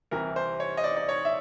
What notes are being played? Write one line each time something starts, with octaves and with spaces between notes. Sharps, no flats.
C2 C3 E3 A#4
C5
C#5
D#5
D5
D5
C#5
E5